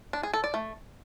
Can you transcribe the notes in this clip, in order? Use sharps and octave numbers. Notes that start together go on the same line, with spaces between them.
D4
G#4
A4
D5
A3